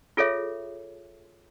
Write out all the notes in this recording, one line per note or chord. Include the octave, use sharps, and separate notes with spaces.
F4 G#4 A4 C#5 E5